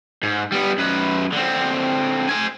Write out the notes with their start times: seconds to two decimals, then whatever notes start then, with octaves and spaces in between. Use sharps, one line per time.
0.23 G#2
0.52 G3 B3
0.78 F#2 B4
1.32 D3 C4
2.29 C5 G#5